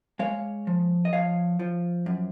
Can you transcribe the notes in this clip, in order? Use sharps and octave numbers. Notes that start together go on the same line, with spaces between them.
G#3 C#5 F5
F3
D#5
F3 C#5 F5
F3
F#2